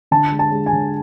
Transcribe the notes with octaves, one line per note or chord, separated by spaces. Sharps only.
D3 A5
G#3
A5
G#3
G#5
D3